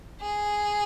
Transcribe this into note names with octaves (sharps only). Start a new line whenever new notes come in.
G#4